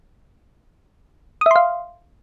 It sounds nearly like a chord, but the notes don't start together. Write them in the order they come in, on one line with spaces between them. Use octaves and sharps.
D#6 E5 C6 F5